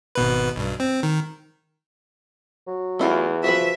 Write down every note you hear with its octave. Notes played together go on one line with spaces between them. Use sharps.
G#1 B2 B4
B1 G2
C4
D#3
F#3
E2 A3 E4 F4
F3 F#4 G#4 B4 E5